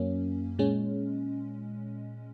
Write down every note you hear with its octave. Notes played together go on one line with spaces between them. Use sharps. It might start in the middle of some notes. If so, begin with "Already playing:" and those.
Already playing: F#2 F#3 A#3 C#4
A#2 G#3 C#4